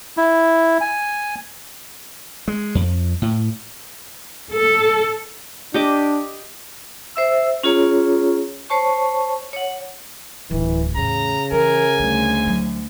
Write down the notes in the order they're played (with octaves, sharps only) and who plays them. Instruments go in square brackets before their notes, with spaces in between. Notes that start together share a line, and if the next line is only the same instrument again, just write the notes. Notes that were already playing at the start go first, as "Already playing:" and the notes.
[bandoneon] E4
G#5
[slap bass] G#3
F2
A2
[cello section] A4
[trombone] D4 [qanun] G4 D#5 D6
[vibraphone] C5 E5 E6
C#4 F4 G#4 C#5 A#5
C5 C#5 A5 C#6
C#5 F#5
[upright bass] D1 [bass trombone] E3
[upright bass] E2 A2 [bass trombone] C#3 [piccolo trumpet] A#5
[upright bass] E3 [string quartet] A#4 [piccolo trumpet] G#5
[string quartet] D2 [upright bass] G3 C4
[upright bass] F#3